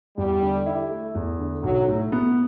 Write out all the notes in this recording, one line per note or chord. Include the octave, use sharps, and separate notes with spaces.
E2 G3
D3
E4
A3
E2
D3
B1 F#3
A2
B3